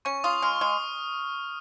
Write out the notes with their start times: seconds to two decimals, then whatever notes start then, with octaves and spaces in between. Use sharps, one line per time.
0.05 C#4 C#6
0.24 F4 D#6
0.42 G#3 F6
0.61 G#3 D#6